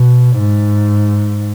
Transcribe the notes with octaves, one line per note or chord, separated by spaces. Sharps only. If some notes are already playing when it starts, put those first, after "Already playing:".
Already playing: B2
G#2